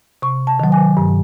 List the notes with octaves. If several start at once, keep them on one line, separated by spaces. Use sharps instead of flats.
C3 C#6
A5
D#3 F#3
G#5
G2